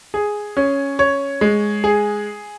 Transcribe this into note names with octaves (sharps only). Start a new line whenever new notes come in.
G#4
C#4
C#5
G#3
G#4